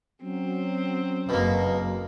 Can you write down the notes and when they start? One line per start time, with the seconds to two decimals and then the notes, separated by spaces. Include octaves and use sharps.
0.23 F#3 C4 C#4
1.29 F#1 B2 A#3